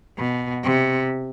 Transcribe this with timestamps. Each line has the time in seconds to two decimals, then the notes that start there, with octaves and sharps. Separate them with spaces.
0.18 B2
0.64 C3